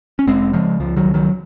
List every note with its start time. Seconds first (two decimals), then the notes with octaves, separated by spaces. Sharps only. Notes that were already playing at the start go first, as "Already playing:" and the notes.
0.19 C#4
0.27 F1 G#3 C4
0.53 C#3 F3 G#3
0.80 C#2 F3
0.96 D#3 F#3
1.06 C#2
1.14 D#3 F#3